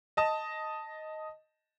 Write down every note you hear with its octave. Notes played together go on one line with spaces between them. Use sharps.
D#5 A5 D#6